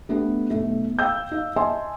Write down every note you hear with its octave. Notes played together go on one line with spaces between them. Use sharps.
A3 B3 D4 G4
B1 A3
F5 G5 E6 G6
D#4 F5
D#5 E5 G#5 A5 C6